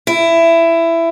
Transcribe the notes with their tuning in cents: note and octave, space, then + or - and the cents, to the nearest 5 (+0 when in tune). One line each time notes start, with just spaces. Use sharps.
E4 +15